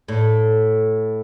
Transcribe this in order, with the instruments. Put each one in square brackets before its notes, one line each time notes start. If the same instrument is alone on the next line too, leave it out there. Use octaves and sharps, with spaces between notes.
[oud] A2